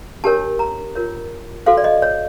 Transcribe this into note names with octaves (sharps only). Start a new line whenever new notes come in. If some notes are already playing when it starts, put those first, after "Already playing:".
D4 G4 A#4 C#5 A5
A#5
F4 A#4 C#5
F#4 A4 C5 F5
D5
D#5
C#5